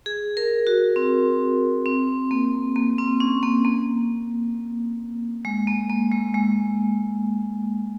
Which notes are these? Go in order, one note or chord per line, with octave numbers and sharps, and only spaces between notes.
G#4
A#4
F#4
C4
C4
A#3
A#3
C4
C#4
A#3
A#3
G#3
A#3
A#3
G#3
G#3